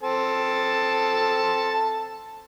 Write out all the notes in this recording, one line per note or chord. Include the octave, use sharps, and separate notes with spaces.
C4 A4 A5